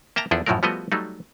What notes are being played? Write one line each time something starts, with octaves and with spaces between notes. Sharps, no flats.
A#3 E5 G5 A5 A#5
E2 F3 D4 E4 G#4 A4
F#2 A2 F3 F#3 A3 A#4
F3 G3 A3 B3 F#4 D#5
F#3 G3 A3 D#4